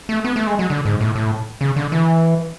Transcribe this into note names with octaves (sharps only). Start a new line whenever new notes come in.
A3
B3
A3
G#3
F#3
D3
G#2
A2
A2
C#3
D3
E3